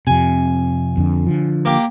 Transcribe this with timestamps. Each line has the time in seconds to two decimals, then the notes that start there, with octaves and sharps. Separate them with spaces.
0.07 F2 C3 G#5
0.97 F2 D3
1.27 D3 F3
1.65 A#3 G4